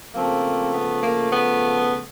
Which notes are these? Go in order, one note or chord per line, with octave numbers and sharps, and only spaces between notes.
C#3 F3 A3 A#3 C4
B3
A#3
B3